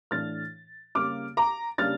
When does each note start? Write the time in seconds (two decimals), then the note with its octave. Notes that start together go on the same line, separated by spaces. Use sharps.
0.11 A2 E3 A3 D4 F6 A6
0.95 C#3 G3 A#3 D6 F6
1.37 A#5 D6
1.78 C#3 G3 A#3 D4 F6 A6